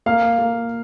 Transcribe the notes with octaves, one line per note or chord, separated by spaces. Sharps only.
A#3 F5
A#3